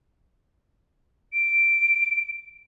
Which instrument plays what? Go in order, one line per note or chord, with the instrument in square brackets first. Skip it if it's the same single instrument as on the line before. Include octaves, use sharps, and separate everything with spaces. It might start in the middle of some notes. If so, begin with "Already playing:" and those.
[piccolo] D7